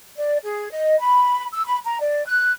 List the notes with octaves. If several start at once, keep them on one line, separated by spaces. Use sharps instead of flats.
D5
G#4
D#5
B5
E6
B5
A#5
D5
F#6